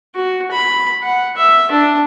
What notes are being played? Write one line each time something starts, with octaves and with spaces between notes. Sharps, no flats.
F#4
B5
F#5
E5
D4